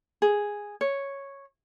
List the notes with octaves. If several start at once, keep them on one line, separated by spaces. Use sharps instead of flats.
G#4
C#5